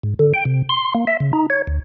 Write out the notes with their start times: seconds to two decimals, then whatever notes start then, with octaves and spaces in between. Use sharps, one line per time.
0.03 G#2
0.19 D3
0.34 G5
0.45 C3
0.69 C6
0.95 A#3
1.07 E5
1.20 C#3
1.33 D#4
1.50 C#5
1.67 D2